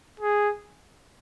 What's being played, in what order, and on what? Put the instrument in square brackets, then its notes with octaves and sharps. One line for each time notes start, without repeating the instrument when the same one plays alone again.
[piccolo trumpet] G#4